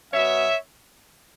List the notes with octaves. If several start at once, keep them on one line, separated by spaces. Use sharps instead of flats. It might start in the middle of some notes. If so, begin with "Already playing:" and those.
B2 F#3 B3 C#5 E5